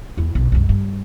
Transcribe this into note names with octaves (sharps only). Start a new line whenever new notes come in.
E2 E4
B1
C2 F#2
G2